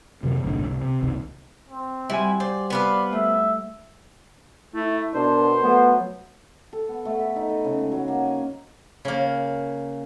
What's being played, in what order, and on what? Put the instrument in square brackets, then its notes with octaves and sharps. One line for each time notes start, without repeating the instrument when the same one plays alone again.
[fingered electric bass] F2 C3 D#3 F#3
G1 C2 A2 D4
C2
C3
F#1 C2 B2 D#3
[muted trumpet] C4
[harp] G3 F#4 G#5 [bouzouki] E4
[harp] C5 [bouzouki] D5
[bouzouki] B3 B4 F5 [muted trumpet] D5
[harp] A3 [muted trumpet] E5
[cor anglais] A3 [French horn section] E4
[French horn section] B2 A#4 [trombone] D4 [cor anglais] C5
[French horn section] F#3 A3 [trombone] B3
[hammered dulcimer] A4
B3
A3
B5
D#4
D#5
C#3
G#3
F#3
A#3
G#5
[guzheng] C#3 A#3